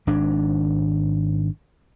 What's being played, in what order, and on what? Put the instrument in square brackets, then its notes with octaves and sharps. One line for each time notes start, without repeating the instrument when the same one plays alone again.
[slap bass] G#1 G#2 D4